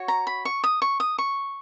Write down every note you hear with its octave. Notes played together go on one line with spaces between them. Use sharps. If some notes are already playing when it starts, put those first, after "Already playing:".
Already playing: F#4 C#5
A#5
B5
C#6
D#6
C#6
D#6
C#6